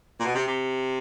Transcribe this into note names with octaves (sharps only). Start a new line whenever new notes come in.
A#2
B2
C3
C3